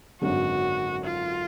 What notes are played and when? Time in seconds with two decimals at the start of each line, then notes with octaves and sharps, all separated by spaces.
0.21 G#1 F#2 D3 F#4
1.04 F4